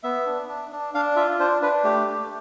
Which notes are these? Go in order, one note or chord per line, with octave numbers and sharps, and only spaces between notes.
B3 E5
D4
D4
D4
D4 F5
F4 E5
D4 C5
D4 B4
A3 G4
A3